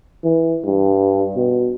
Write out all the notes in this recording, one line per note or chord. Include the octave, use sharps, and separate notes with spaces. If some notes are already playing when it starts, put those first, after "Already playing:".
E3
G2
B2